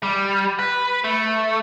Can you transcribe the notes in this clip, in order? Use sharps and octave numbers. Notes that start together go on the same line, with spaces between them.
G3
B4
A3